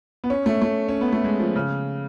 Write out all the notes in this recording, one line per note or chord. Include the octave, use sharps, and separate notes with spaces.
B3
C#4
A3
A3
C#4
B3
A3
G#3
F3
C#3